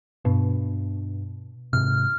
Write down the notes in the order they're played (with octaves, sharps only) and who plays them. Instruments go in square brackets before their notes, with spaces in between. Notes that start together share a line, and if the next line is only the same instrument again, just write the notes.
[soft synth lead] G2 [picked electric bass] B2
[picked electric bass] G#2 C3 [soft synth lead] F6